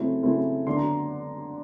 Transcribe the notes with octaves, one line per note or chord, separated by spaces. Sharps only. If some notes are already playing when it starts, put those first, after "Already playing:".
Already playing: C#3 F#3 A3 C4 E4
C#3 F#3 A3 C4 E4
D3 F#3 B3 C6
A#5